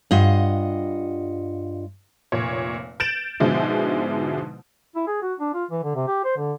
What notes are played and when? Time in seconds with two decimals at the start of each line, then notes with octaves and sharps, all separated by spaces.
0.11 G2 F4 D#5 F#5
2.32 F1 A#2 C#5
3.00 G6 A6 D7 E7 F#7
3.40 G#2 B2 D3 F3 G#3 E4
4.96 E4
5.07 G#4
5.22 F#4
5.40 D4
5.54 F4
5.71 E3
5.83 D3
5.95 C3
6.08 G4
6.25 C5
6.37 D3